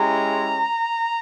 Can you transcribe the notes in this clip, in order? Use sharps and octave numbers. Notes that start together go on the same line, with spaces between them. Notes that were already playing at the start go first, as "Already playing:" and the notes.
Already playing: G#3 C#4 E4 G4 A#5